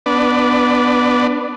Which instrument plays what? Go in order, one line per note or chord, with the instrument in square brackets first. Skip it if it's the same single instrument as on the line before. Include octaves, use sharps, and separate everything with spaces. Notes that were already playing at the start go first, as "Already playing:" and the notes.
[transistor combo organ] B3 D4